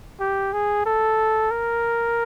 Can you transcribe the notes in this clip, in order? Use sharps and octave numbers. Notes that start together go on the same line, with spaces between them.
G4
G#4
A4
A#4